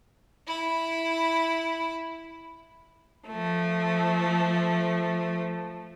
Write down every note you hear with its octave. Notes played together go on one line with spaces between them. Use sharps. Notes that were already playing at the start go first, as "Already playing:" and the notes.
E4 B5
F3 A3